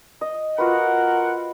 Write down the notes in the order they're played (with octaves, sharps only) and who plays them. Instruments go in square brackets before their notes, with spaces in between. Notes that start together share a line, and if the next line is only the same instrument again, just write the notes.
[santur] D#5
[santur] F4 F#4 B4 [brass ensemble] A#4 F#5